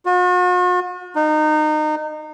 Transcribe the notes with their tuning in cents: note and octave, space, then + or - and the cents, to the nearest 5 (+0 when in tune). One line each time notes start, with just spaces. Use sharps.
F#4 -45
D#4 -25